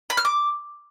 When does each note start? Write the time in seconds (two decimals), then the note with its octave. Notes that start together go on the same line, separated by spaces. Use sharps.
0.10 B5
0.17 F6
0.25 D6